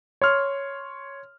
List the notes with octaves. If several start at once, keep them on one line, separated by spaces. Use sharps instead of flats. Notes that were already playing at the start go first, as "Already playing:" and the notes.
C#5 C6 F6